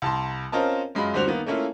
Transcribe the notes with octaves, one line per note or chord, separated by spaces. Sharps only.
C2 A5 C6
C4 C#4 F4 A#4 D#5 A5
F#2 G#3 F4 B5
D2 G3 C4 F#4 C5 F7
D#3 A#3 B3
A3 A#3 C#4 E4 F4